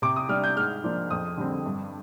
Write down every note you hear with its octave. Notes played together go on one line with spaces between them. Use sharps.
C3 D6
D#6
G3 D4 F6
G6
G#2 F6
F3 A#3 D4
F2 D#6
D3 G3 C4
G2